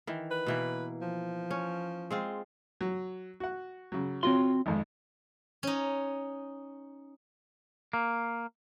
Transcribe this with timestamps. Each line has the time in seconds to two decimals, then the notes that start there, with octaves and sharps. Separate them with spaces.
0.07 D#3 E3
0.31 B4
0.46 B2 E3 A#3
1.02 F3
1.51 C#4
2.11 G#3 C4 F4
2.81 F#3
3.40 F#4 F#5
3.92 C#3 F#3
4.23 C4 F4 F#4 C#5 C6
4.66 G#1 F2 G#2
5.63 C#4 D#4
7.93 A#3